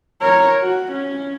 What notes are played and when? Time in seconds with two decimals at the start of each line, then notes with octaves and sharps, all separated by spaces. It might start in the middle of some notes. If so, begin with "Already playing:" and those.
0.21 A#4 C#5
0.61 F#4
0.92 C#4